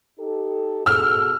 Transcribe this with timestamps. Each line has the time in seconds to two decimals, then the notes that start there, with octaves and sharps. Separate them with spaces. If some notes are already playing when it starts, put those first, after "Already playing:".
0.19 D#4 G4 A4
0.86 B2 G#4 A4 E6 F6